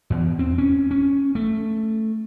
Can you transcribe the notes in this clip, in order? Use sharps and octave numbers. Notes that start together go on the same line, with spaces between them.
E2
C4
C#4
C#4
A3